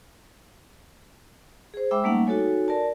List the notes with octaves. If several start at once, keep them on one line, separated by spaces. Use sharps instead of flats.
G#4 C5
G#3 E5 G5 B5 D6 E6
G3 A3 A#3 C#4 D#4 F#5
D#4 F#4 A4 C#5 G#5
A#4 D5 A5